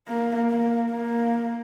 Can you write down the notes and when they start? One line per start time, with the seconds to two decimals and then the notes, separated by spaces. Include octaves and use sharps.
0.09 A#3
0.50 A#3
0.91 A#3